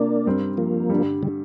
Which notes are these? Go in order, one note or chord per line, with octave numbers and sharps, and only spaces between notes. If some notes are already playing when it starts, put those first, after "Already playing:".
Already playing: C3 A#3 D4 F4
G2 G3 C4 A#4
F3 A#3
G2 D3 G3
D3 G3